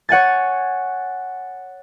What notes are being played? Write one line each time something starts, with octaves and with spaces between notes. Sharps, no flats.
C#5 F#5 G#5 A6